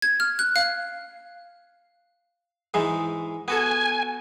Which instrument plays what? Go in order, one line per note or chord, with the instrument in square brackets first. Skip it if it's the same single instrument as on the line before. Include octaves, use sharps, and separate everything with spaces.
[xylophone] G#6
F6
F#6
F5
[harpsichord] G#2 E3 G#3
[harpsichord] B3 F#4 A4 [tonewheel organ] G#5